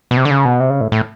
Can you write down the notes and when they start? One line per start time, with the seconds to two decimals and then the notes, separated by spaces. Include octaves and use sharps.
0.11 B2
0.17 C3
0.25 D3
0.30 C#3
0.45 B2
0.60 C3
0.70 C#3
0.81 A2
0.92 A2